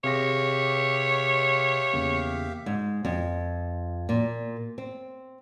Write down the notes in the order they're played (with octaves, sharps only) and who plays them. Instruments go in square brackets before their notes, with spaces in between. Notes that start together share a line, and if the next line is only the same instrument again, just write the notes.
[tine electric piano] C3 G#4 A#6 [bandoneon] G4 E5 F5 [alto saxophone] C#5
[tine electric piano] E2 C#3 A#3
[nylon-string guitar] G#2
F2
A#2
C4